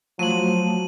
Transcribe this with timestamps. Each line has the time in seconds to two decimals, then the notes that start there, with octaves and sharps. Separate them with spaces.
0.19 F3 F#3 A3 D#7 F#7